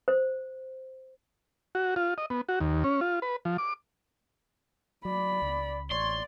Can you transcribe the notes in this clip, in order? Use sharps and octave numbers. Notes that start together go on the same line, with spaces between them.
C5
F#4
F4
D#5
B3
F#4
D#2
C#4
F4
B4
F3
D6
F#3 D5 B5
C#2
A1 C#5 D5 C6